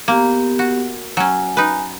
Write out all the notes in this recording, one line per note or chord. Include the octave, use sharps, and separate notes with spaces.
A#3 B3 G4
F#4
F#3 C#4 G#5
D#4 B4